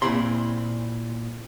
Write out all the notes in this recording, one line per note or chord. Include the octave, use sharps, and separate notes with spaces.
A#2 C4 E4 B5 C6